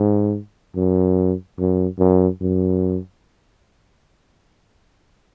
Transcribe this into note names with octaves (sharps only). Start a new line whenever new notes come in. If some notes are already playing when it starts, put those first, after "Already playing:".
Already playing: G#2
F#2
F#2
F#2
F#2